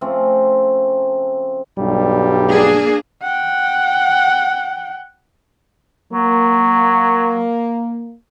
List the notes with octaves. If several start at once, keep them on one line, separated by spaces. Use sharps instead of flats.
C#3 F3 A3 C4
B1 G2 G3
A#3 D4 G#4
F#5 G5
F#3 A#3